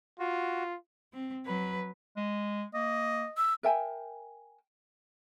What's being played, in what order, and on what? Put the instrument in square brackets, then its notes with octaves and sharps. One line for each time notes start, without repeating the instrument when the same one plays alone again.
[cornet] F4 [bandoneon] F#4
[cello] C4
F#3 B4
[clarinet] G#3
[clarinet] A#3 [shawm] D#5
[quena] E6
[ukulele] A#4 E5 G5 G#5